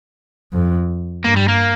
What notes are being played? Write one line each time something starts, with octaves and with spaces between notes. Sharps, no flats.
F2
G2 A#3
G3
A#3